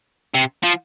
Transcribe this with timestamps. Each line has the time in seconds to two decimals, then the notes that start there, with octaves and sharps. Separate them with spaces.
0.34 C3
0.64 F3